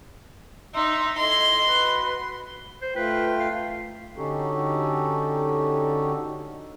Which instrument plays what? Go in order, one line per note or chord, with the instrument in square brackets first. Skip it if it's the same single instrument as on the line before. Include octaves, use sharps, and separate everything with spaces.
[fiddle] D#4 [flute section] E5 C6 E6
[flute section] E4 A4 D#5 [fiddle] C6
[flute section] F#4 B4
[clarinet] C5
[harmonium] A3 F4 G5 [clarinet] B4
[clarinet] F5
[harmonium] D3 C#4 D#4 F#4 G4 A4